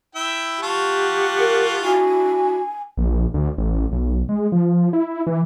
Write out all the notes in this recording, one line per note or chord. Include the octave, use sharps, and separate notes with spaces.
E4 E5 G5
F4 G4 F#5 A5 C#6
A#4
D4 E4 F#4 G#5
A#1
D2
A1
B1
G#3
F3
E4
E3